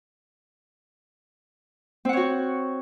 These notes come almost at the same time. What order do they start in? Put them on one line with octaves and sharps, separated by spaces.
C4 F#5 C#5 F#4